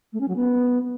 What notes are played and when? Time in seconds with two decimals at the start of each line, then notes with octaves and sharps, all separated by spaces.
0.13 A3
0.21 C#4
0.28 F#3
0.36 B3